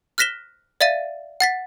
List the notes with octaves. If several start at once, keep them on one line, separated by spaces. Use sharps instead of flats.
F6 F#6 A#6 B6 E7 G7
D5 E5 F5 A6 D#7
F#5 A6 B6